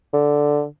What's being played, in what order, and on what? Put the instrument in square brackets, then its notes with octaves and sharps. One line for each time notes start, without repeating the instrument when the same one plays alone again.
[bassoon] D3